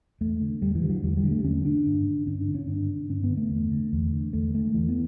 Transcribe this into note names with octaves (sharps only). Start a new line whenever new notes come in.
E2 A3
D3
E2 G3
E3
D3
F#3
E2 G3
G3
D3
A3
E2 C#4
D3 D4
G2
D3
G2 C#4
D4
D3
C#4
G2 D4
D3
G2 C#4
B3
D3
A3
E2
D3
E2
D3
E2 A3
D3 A3
E2 E3
B3